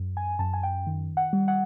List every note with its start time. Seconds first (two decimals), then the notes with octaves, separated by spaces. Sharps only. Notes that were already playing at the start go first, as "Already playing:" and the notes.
Already playing: F#2
0.17 G#5
0.39 F#2 A5
0.54 G#5
0.63 G5
0.87 D#3
1.17 F#5
1.33 G3
1.48 F#5